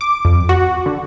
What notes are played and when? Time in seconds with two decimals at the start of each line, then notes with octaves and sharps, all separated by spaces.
0.01 D6
0.25 F2
0.49 F#4
0.86 D3